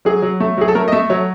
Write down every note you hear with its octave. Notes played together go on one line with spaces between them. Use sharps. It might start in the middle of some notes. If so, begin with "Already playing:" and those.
F#3 G#4
F#3
A3
F#3 G#4
A4
A3 A#4
D#5
A3 E5
F#3 C#5